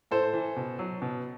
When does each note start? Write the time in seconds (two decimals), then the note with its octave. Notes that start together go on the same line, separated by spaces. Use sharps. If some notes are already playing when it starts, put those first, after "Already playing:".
0.11 A2 A4 C5
0.33 E3
0.56 B2
0.79 F#3
1.02 B2